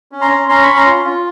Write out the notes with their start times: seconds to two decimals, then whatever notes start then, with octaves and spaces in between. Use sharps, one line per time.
0.12 C#4
0.21 A#5 C6
0.31 C#4
0.49 C#4 A#5 C6
0.63 C#4 B5 C#6
0.76 A#5 C6
0.86 F4
1.05 F4